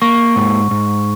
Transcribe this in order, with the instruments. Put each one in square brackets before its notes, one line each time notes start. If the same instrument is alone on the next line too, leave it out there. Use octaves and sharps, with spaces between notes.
[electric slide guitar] A#3 [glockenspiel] C#6
[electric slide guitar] G#2
G#2